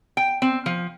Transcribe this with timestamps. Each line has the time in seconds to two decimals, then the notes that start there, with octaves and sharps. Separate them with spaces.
0.17 G5
0.42 C4
0.66 F3